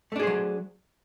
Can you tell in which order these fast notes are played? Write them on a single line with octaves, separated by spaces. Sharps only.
A3 D4 G#4 C5 F#3